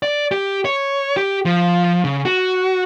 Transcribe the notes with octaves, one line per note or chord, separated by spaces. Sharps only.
D5
G4
C#5
G4
F3
C#3
F#4